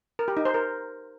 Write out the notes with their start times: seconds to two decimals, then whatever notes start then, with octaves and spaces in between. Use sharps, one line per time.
0.19 A#4
0.28 G4
0.37 D#4
0.45 C5
0.54 A#4